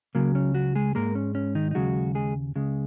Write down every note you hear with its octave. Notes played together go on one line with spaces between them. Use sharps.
C#2 C#3 F#3 A#3
C#4
F#3 F#4
G#3 G#4
G#2 G#3 A#3 A#4
C#4
C#4
D#3 D#4
D#4
D#2 C#3 F#3 G#3 F#4
G#3 G#4
C#2 C#3 G#3